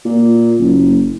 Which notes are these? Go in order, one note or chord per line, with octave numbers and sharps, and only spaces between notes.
A#2
F#1